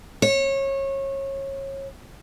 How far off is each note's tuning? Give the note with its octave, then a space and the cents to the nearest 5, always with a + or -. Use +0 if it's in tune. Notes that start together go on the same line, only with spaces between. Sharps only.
C#5 -25